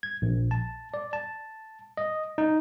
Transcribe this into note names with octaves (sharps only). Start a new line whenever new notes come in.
G#6
A#1
A5
D5
A5
D#5
D#4